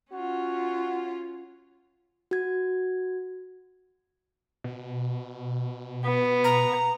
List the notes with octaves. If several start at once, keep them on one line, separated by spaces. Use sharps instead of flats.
C#4 F4 F#4
F#4 G#6
B2
B3
A#5